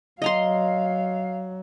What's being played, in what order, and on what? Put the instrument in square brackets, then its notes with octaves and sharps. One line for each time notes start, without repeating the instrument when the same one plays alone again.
[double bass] F#3 [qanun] D#5 A#5 C6 [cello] F5